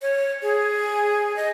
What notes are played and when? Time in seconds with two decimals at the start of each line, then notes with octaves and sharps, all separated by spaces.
0.02 C#5
0.42 G#4
1.36 D#5